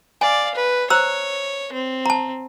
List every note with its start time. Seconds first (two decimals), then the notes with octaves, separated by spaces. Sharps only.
0.21 D5 F5 G#5
0.55 B4
0.90 C5 C#5 A#5 E6
1.73 C4
2.06 A5 A#5